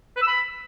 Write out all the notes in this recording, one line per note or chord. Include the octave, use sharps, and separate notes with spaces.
B4
E6
B5